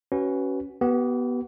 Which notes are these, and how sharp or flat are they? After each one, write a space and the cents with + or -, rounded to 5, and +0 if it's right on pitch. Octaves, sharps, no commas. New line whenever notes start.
C#4 +0 F#4 +25 B4 +0
B3 -10 G4 -40